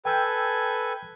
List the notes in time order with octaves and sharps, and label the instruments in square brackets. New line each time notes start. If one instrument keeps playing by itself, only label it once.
[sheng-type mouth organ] A4 B4 G#5 [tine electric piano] G5 E6 G6